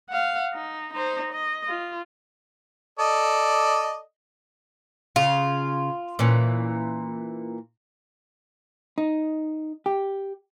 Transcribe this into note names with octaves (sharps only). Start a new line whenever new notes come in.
F5 F#5
D#4
D#4 C5
D#5
F4
A4 D5 D#5
C#3 F4
A#2 E3 C#4
D#4
G4